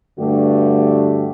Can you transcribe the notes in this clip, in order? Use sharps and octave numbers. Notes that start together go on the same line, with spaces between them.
G2 D3 A3 F#4 G4